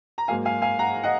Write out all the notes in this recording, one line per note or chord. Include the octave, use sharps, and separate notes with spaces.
A#5
G#2 F#3 A#3 F5 G#5
F5 G#5
F5 G#5
F#5 A#5
D#5 F#5